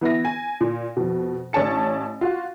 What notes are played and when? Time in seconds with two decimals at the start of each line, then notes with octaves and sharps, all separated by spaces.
0.01 E3 B3 E4 A#6
0.25 G#5
0.61 A#2
0.97 F2 B2
1.53 A1 D4 C#5 A5 C#7
2.21 F4 F#4